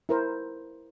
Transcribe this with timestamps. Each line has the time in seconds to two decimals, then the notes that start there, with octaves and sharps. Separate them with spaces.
0.09 E4 A#4 C5